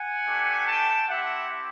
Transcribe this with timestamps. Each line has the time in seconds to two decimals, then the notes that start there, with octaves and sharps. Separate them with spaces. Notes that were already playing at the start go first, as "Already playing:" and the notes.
Already playing: F#5 G#5
0.27 A3 D4 G4
0.67 G5 A5
1.08 C4 E4 G4 E5 F#5